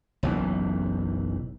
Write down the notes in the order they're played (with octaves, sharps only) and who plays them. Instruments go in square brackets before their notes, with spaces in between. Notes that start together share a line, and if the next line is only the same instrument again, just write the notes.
[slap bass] F#1 B1 E3